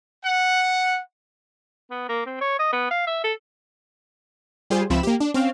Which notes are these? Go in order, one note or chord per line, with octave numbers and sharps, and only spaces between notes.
F#5
B3
A#3
C4
C#5
D#5
B3
F5
E5
A4
G3 F4 G#4 C5
C#2 F3 C4 E5 B5 E7
A#3 G4
D4
C4 C#4 F5